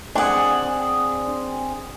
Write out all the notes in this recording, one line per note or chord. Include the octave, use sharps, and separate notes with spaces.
C4 D4 G#4 F#5